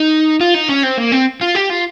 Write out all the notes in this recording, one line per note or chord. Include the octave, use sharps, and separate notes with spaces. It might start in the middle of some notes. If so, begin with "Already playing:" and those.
Already playing: D#4
F4
D#4
C#4
C4
A#3
C4
F4
G4
F4